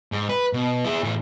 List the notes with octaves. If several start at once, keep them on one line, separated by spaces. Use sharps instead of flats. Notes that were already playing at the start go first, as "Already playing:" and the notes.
G#2
B4
B2
E4 G#4
A2 E3